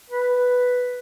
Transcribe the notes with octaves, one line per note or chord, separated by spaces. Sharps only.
B4